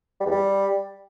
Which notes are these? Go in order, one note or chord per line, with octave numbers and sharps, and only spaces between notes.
G3
E2
G3